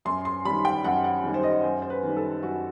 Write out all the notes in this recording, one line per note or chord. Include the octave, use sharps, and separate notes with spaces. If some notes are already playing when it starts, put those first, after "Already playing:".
F#2 C6
C6
D#3 G3 B5
G5
F#2 F#5
F#5
D#3 G3
C5
D#5
F#2 C5
C5
B4
D#3 G3
A4
F#2 F#4